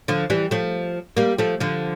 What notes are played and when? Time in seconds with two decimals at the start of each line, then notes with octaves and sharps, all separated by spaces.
0.08 D3 F3
0.30 E3 G3
0.51 F3 A3
1.17 G3 A#3
1.38 F3 A3
1.60 D3 F3